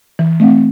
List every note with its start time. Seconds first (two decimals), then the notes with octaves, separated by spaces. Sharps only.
0.19 E3
0.40 A3 C4